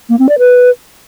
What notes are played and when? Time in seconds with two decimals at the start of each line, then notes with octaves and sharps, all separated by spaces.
0.09 A#3
0.19 C4
0.29 D5
0.38 B4